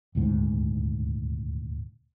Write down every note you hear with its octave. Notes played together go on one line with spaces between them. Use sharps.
D#1 D2 G#2